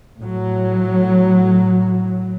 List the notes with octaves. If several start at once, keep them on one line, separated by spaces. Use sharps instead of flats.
A2 F#3